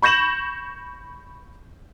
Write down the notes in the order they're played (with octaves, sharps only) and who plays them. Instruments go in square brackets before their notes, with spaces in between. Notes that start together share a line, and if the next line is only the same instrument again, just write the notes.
[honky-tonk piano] B5 C#6 G6 A#6 E7 F#7